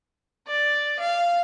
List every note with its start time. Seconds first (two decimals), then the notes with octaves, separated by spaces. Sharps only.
0.47 D5
0.99 F5